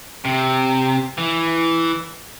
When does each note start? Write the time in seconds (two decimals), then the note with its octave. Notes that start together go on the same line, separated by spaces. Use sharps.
0.25 C3
1.18 E3